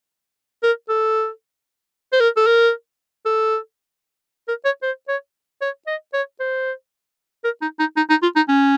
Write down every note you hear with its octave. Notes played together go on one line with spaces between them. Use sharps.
A#4
A4
C5
A#4
A4
A#4
A4
A#4
C#5
C5
C#5
C#5
D#5
C#5
C5
A#4
D#4
D#4
D#4
D#4
F4
D#4
C#4